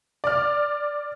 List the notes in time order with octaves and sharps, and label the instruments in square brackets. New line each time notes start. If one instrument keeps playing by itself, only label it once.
[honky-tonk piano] D5 D6 F6